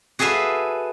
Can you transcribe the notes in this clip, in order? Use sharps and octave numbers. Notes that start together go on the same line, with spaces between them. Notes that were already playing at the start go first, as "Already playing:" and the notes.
F#4 G#4 A4 B4 E5 F5